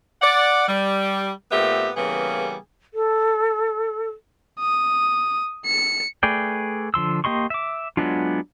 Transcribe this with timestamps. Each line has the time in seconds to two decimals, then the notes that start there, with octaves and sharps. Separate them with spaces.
0.22 D5 F#5
0.68 G3
1.51 A#2 A3 B3 C4 G4 E5
1.97 C#3 E3 G3 A#3 B3 G#4
2.94 A4
4.60 D#6
5.66 C#7
6.23 A3 G#4 B4 D5 G5
6.94 D3 F3 C6 E6
7.24 A#3 G4 D#5 C6 C#6
7.50 E5 D6
7.97 F#3 G#3 B3 D4 F4